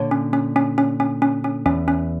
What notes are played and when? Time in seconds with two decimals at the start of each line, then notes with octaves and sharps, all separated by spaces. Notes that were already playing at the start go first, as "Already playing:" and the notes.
Already playing: A#2 D3 C#5
0.11 C#4
0.33 C#4
0.56 C#4
0.78 C#4
1.00 C#4
1.22 C#4
1.44 C#4
1.65 E2 C#4
1.88 C#4